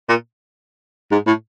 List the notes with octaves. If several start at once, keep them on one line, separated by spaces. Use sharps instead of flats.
A#2
G#2
A2